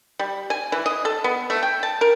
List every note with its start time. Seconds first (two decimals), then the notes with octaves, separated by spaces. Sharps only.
0.19 G3
0.50 G#5
0.72 E3
0.86 D#5
1.05 A4
1.24 B3
1.50 A3
1.63 G5
1.83 A5
2.01 A#4